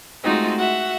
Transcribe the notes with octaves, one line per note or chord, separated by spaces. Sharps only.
G#3 A3 C4 D#4 F4 F#4
F#4 E5 F#5